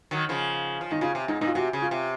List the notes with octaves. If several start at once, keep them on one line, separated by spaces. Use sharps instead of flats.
D#3 F#3
C#3 F3
F3
D#3 D#4
C#3 F4
C3
G#2 D#4
A#2 D#4
F4
C3 F#4
C#3
F4
C3